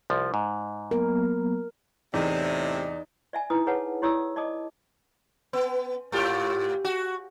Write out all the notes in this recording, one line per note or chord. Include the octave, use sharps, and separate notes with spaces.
C2 F3
G#2
F#3 A#3 B3 A#4
E2 A2 C3 D#4 D5
D5 E5 G#5
D#4 E4 B4 D#6
G#4 B4 C#5 F#5 A5
E4 G4 C#5 D5 D#6 E6
D5 D#5 A5 D6 D#6
B3
G#2 F4 G4
F#4